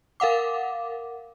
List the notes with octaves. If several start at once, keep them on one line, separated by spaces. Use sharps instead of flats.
A#4 F5 F#5 D6